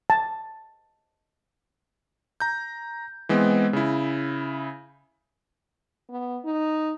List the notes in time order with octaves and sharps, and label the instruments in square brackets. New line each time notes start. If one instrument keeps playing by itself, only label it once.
[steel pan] A5
[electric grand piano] A#5 G6
E3 G#3 B3 C4
C#3 E4
[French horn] B3
D#4